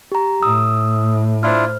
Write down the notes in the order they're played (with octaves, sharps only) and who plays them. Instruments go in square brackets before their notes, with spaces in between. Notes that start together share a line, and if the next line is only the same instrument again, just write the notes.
[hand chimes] G4 A#5
[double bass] A2 [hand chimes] D#6 E6
[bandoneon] D4 E4 F4 [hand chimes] C5 F6